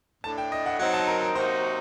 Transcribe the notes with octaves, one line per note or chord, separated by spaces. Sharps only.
A2 A3 D4 A5
G5
D#5
F#5
F#3 C4 D#4 F#5
A5
A#4
A#4
C3 F#3 A#3 D#4 F#4 C5